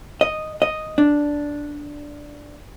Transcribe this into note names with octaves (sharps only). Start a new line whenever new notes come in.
D#5
D#5
D4